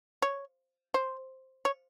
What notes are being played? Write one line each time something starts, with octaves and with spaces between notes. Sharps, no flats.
C#5
C5
C#5